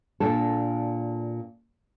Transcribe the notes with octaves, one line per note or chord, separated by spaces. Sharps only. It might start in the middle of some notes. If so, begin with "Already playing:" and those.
A#2 D4 A4